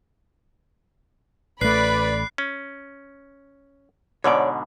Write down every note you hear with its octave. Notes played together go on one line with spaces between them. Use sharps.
A1 A3 B4 D5 B5 F#6 C7
C#4
G#2 B2 D3 C#5 D5